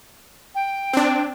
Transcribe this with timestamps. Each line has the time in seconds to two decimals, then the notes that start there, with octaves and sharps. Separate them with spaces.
0.54 G5
0.93 C4 D4